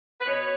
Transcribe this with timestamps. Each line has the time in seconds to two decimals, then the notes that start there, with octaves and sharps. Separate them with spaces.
0.21 B4
0.27 B2 C#5